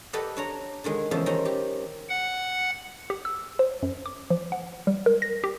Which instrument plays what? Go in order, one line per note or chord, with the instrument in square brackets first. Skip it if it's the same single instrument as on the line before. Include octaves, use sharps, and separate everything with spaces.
[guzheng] G4 A4 B4 D5 D#5 F#5
D4 C#5 A#5
D3 D#3 G#3
E2 C#3 F3 B3 E5 A5
D#3 G3 C#4 C5 A#5
G4
[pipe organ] F#5
[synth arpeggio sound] G4
E6
C5
F#2
D6
F3
F#5
G3
A#4
A#6
G4